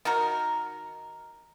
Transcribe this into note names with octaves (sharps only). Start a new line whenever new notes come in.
D#3 F#4 A#4